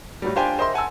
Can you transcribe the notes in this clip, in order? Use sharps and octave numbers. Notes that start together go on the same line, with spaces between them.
A2 F#3 G3
D4 F4 G4 C5 G5 G#5
A#4 C5 D#5 E5 C6
F#5 G#5 A5 E6